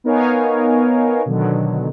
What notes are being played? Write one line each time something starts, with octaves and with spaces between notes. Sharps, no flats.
B3 D#4 A#4 C#5 F5 G#5
B2 D3 D#3 F#3